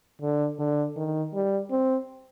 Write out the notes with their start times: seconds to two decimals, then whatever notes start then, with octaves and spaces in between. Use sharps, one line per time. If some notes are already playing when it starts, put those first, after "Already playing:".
0.22 D3
0.59 D3
0.96 D#3
1.33 G3
1.71 C4